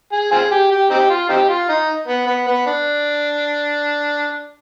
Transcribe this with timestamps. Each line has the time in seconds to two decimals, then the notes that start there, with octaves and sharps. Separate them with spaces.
0.12 G#4
0.32 C4 F4 G#4
0.51 G4
0.71 G4
0.90 C4 D#4 G4
1.10 F4
1.29 C4 D#4 G4
1.49 F4
1.69 D#4
2.08 B3
2.27 B3
2.47 B3
2.67 D4